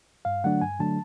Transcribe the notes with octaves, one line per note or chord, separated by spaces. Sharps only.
G2 F5
D3 F#3 A3 D4 F#5
G2 G#5
D3 F#3 A3 D4 A5